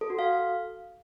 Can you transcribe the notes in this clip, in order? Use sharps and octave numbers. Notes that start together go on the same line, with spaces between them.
A4
F#4
F5